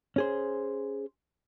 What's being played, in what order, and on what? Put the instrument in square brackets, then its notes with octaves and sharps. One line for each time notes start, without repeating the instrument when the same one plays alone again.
[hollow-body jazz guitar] C#4 G#4 C5